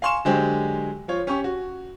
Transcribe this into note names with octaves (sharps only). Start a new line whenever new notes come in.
F5 G#5 C6 C#6 E7
D3 F#3 G#3 G4 C5
F3 F4 C#5
C#4 G4 C#6
F#4